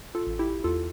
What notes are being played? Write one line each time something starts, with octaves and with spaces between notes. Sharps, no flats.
F4 A4
A1
E4 G4
E2 F4 A4